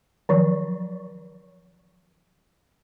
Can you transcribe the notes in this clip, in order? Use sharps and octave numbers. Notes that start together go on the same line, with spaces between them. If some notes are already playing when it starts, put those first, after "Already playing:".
D#3 F3 F#3